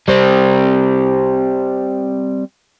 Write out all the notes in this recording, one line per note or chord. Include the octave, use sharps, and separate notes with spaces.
G3 C4